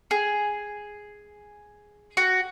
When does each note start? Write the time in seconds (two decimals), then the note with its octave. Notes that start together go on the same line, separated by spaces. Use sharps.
0.11 G#4
2.17 F#4